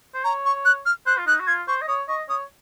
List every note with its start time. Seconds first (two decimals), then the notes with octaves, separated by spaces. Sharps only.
0.14 C5
0.24 C#5 A#5
0.46 C#6
0.65 F#6
0.86 F6
1.06 C5 F#6
1.18 F4
1.26 D#4 F#6
1.40 F#4
1.47 F4 G#6
1.68 C5 C#6
1.81 D#5
1.88 C#5 D#6
2.08 D#5 C#6
2.29 C#5 D#6